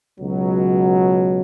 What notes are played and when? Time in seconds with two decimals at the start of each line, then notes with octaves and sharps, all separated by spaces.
0.18 C#2 B2 F#3